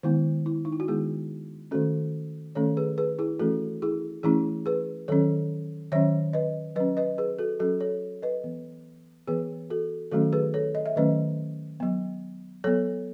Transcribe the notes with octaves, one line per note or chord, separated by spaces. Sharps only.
D#3 G#3 B3 E4
E4
D#4
E4
F#4
D#3 G#3 B3 E4 G#4
D#3 A3 C#4 F#4 A4
D#3 A3 C#4 A4 C#5
G#4 B4
G#4 B4
E4 G#4
E3 A3 C#4 F#4 A4
E4 G#4
E3 A3 C#4 E4 G#4
G#4 B4
D#3 F#3 C#4 A4 C#5
D#3 F#3 C#4 C#5 E5
B4 D#5
F#3 C#4 B4 D#5
B4 D#5
G#4 B4
F#4 A4
F#3 C#4 F#4 A4
A4 C#5
B4 D#5
E3 B3
E3 B3 G#4 B4
F#4 A4
D#3 F#3 A3 C#4 F#4 A4
G#4 B4
A4 C#5
D#5
E5
D#3 F#3 A3 C#4 B4 D#5
F#3 B3
F#3 B3 A4 C#5